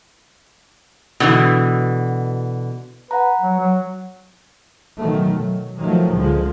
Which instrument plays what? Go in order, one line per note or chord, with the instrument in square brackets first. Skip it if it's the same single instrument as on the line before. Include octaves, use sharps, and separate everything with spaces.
[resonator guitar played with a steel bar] B2 D3 E3
[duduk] B4 [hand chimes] F#5 A#5
[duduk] F#3
F#3
[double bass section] B2 D#3 F#3 A3
F#3
D#3 F3 F#3 A3
C#2 D3 F3 G#3